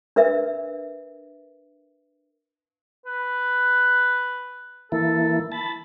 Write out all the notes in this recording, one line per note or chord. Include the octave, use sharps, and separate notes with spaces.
D4 A#4 B4 E5
B4
E3 A#3 E4 A4
A5 B5